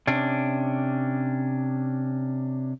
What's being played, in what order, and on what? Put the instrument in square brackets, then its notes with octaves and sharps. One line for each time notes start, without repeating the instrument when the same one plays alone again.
[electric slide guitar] C3 C#4 D4